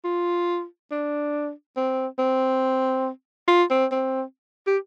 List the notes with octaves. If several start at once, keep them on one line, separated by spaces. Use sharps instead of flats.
F4
D4
C4
C4
F4
C4
C4
G4